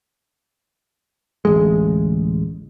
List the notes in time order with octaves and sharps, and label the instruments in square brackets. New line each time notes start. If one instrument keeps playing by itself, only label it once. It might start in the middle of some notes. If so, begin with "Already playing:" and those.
[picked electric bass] D1 A1 G#3